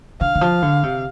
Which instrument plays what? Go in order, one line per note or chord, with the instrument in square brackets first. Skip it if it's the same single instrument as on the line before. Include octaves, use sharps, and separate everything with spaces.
[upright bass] D3 [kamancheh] F5
[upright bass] D#3
F3
D3
C3